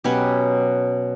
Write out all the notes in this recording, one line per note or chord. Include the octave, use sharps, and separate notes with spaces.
B2 F#3 C#4 G4 B4